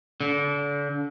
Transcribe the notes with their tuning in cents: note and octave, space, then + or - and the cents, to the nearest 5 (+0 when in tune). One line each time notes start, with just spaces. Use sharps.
D3 -35